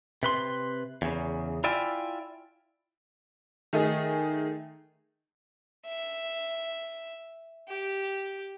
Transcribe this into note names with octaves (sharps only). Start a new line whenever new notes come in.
C3 B4 C6
E2 C#3
E4 F4 D5 E5 G5 G#5
D#3 A3 D#4 G#4
E5
G4